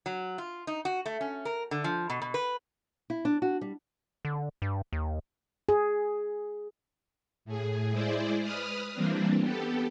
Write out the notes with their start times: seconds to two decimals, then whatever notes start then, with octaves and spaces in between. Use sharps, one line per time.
0.06 F#3
0.38 F4
0.67 D#4
0.85 F#4
1.06 A3
1.21 C#4
1.45 A#4
1.71 D3
1.84 F3
2.10 B2
2.22 B2
2.34 B4
3.10 E4
3.25 D4
3.42 F#4
3.61 G3
4.25 D3
4.62 G2
4.93 D#2
5.69 G#4
7.45 A2 G#4
7.91 G#3 E4 G#4 C5 D5
8.42 B4 D#6 F6
8.94 E3 G3 A#3 C4 D4
9.41 B3 G4 A4